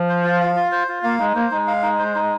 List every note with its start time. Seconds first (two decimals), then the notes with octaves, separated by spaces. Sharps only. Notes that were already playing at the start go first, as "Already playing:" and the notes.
Already playing: F3
0.09 C5
0.24 F4
0.40 F5
0.56 F4
0.72 C5
0.89 F4
1.04 A#3 F5
1.19 G#3 D#4
1.35 A#3 C5
1.51 G#3 D#4
1.67 F5
1.82 D#4
1.99 C5
2.15 D#4